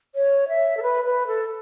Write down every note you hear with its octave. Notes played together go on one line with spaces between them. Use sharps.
C#5
E5
A4
B4
B4
A4